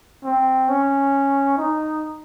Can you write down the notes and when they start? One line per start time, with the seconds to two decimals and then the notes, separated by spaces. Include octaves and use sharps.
0.24 C4
0.69 C#4
1.58 D#4